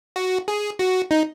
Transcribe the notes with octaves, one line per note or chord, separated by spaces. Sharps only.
F#4
G#4
F#4
D#4